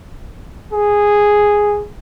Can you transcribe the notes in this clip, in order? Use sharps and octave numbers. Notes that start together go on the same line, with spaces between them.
G#4